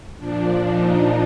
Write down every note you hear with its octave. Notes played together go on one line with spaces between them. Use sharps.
A#2 F3 D4
D#4